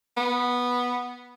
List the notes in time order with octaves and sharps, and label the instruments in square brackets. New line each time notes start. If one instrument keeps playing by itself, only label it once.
[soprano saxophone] B3